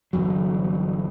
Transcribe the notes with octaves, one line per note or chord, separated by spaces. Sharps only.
G1 E2 F#3